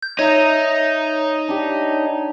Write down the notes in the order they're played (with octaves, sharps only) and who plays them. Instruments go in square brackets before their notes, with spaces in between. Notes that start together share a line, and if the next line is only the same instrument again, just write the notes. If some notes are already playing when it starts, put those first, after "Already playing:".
[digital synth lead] G6
[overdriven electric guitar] D#4 [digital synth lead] C#5 [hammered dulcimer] D#5 E5 A#5
[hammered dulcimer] D4 G4